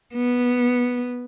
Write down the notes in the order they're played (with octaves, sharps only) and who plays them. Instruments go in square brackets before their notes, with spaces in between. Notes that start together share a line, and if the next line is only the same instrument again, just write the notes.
[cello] B3